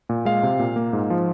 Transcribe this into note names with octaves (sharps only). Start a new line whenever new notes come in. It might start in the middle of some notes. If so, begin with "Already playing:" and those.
A#2
G#3 F5
C3
A#2
A#3
G#2
F3